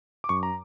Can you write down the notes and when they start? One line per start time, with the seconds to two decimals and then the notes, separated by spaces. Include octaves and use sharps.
0.24 D6
0.29 F#2 C#6
0.43 A#5